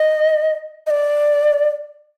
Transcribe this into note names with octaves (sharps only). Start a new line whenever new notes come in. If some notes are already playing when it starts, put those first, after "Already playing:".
Already playing: D#5
D#5
D5